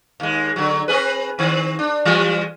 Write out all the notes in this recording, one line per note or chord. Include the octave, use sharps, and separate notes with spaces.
D#2 G#3
D3 F#3
C4 G#4 B4
D#3 C4
D4
E3 G3 G#3